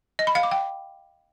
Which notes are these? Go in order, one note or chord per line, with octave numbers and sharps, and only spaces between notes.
D#5
B5
F5
D6
G5